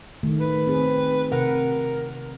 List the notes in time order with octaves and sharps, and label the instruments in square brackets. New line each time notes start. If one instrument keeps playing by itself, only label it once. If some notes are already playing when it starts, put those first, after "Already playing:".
[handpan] D#3 A3
[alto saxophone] B4
[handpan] C4 G#4
[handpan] C3 F#5 [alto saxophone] A#4